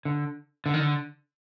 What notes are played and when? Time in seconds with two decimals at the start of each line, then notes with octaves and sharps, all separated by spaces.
0.05 D3
0.66 D3
0.74 D#3
0.80 D3